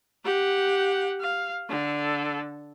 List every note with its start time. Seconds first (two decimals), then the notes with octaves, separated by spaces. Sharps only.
0.24 G4 F#5
1.21 F5
1.69 D3 A4